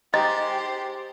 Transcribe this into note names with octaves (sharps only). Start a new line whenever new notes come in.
G#3 D#4 G4 C5 G5 A6